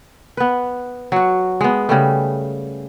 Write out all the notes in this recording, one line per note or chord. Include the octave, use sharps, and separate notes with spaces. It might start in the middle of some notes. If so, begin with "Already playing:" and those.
B3 B4
F#3 F#4
G#3 B3
C#3 G3 A3